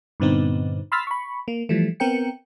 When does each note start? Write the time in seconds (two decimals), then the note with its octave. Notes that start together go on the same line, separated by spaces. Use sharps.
0.20 G2 A#2 D3 B3 C4 D#4
0.92 B5 C6 E6 F6 A6 B6
1.07 B5 C#6
1.48 A#3
1.69 E3 F3 G3 A3
2.00 B3 C4 A#4 G5 C#7